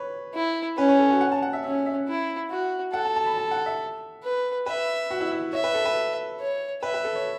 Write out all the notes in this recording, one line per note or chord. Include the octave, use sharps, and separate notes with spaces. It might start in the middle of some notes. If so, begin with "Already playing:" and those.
Already playing: B4 C#5
E4
C#4 B4
C#5
A4
F#4
F#5
A5
F#5
E5
C#4 E5
E5
E4
F#4
A4 F#5
A5
A5
B5
A5
F#5
E5
B4
B4 E5
F#4
E4
E4
C#5 E5
B4
A4
B4
C#5
B4 E5
B4
A4
C#5